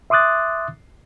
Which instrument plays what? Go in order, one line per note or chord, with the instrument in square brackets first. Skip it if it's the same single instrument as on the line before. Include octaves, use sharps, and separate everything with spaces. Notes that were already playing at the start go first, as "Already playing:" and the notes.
[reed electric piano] E5 C6 D6 D#6 F#6 A6